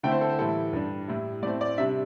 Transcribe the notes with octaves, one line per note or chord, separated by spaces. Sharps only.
D3 A3 C4 E4 G5
C5
A4
C5
A2 E3 G3 E4 A4
G2 G3 D4
A2 G3 E4
A2 A3 C4 D5
D5
C3 G3 D4 E5